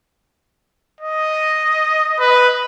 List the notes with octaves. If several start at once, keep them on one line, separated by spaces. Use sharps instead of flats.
D#5
B4